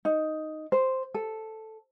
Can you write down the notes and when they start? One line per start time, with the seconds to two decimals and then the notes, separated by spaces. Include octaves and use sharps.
0.05 D#4
0.72 C5
1.14 A4